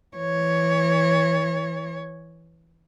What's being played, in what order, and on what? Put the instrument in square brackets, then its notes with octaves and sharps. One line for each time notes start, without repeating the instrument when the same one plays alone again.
[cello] E3 C#5